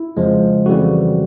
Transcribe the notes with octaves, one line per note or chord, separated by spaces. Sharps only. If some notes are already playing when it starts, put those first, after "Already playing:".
Already playing: E4
F2 C#3 F3 G#3
F2 C#3 E3 G3 F#4